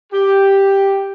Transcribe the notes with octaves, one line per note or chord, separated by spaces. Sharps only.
G4